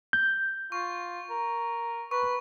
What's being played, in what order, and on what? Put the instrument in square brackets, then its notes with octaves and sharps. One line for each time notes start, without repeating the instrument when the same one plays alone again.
[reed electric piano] G6
[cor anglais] F4 [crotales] C#6
[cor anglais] A#4
[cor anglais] B4 [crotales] C#6